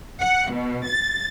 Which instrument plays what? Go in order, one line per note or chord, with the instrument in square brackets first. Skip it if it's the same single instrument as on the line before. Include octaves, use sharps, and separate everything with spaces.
[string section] F#5
B2
A6